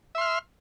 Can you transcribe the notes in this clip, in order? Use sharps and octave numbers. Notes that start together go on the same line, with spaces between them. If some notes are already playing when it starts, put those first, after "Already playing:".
E5 C6 F6